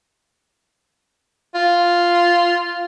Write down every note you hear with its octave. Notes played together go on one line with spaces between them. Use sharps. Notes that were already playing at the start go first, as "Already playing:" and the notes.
F4